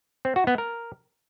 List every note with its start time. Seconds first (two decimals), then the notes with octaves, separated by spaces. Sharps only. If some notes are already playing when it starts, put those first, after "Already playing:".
0.25 C4
0.36 F#4
0.47 B3
0.58 A#4